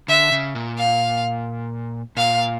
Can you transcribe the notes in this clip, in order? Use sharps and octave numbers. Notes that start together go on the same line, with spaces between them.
D3 E5
C#3
A#2
F5
A#2 F5